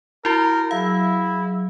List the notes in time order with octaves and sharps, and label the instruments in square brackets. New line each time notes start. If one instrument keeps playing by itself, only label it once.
[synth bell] E4 F#4 [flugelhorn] A#4
[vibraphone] F#3 G#4 E6 [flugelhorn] E4 [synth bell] F5